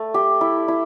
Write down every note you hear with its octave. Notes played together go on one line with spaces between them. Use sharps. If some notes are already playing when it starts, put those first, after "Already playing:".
Already playing: A3
G4
E4
E4